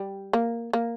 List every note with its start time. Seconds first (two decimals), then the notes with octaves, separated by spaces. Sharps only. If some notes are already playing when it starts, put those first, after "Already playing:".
Already playing: G3
0.33 A#3
0.73 A#3